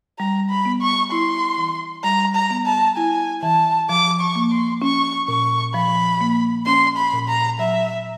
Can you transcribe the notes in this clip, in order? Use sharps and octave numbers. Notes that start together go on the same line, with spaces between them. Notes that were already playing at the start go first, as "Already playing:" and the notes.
G3 A#5
B5
B3
C#6
E4 C6
E3
G3 A#5
A#5
B3
A5
E4 G#5
E3 A5
F3 D6
C#6
A#3
C6
C#4 C#6
A#2 C#6
F3 B5
A#3
C#4 C6
B5
A#2
A#5
F#3 E5